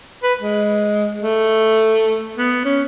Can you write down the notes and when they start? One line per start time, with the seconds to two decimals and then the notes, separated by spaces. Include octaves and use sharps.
0.23 B4
0.41 G#3
1.22 A3
2.37 B3
2.65 C#4